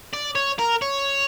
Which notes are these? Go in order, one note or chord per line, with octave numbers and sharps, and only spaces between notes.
D5
C#5
A#4
C#5